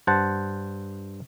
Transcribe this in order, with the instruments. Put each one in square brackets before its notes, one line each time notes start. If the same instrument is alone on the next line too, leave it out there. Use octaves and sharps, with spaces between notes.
[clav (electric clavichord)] G2 C5 F#5 A5